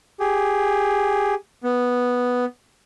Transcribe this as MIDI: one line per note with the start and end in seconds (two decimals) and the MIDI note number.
0.20 1.34 67
0.20 1.34 68
1.63 2.45 59